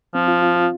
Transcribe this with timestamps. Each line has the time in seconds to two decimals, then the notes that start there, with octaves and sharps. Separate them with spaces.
0.14 F3 C4
0.28 F4
0.42 F4
0.56 F4